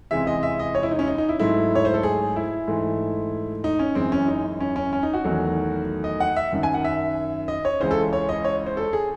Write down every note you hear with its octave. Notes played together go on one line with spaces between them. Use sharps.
C#2 C3 E3 G#3 E5
D#5
E5
D#5
C#5
E4
D#4
C#4
D#4
D#4
E4
G#2 F#3 A3 E4
C#5
C5
A4
G#4
E4
G#2 E3 A3
D#4
C#4
F#2 E3 G#3 C4
C#4
D#4
C#4
C#4
C#4
D#4
F#4
E2 D#3 F#3 A3
D#5
F#5
E5
F#2 D#3 F#3
G#5
F#5
E5
D#5
C#5
C#2 C#3 E3 G#3 C5
A4
C#5
D#5
C#5
C5
A4
G#4